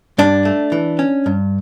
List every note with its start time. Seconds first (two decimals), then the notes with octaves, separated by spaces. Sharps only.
0.18 G2 D4
0.45 A3
0.72 E3
0.99 C#4
1.26 G2